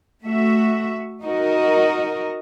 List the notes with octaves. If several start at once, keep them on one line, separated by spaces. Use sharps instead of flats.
A3 F#4 E5
D#4 F#4 A#4 D#5